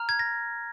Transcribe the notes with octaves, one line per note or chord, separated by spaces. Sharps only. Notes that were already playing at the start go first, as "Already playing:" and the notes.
Already playing: A#5 F6
G#6
A#6